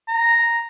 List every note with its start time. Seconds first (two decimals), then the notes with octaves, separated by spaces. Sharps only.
0.08 A#5